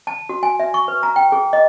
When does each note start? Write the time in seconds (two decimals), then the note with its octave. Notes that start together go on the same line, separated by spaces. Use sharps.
0.07 A5
0.29 F#4
0.43 G#5
0.60 E5
0.74 C#6
0.88 B4
1.03 A#5
1.16 G5
1.32 G#4
1.53 D#5